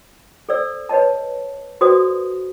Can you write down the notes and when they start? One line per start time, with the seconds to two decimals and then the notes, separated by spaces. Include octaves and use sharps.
0.49 A4 C5 D5 E6
0.89 B4 C#5 D#5 A5
1.81 F#4 A4 B4 C5 D5 D#6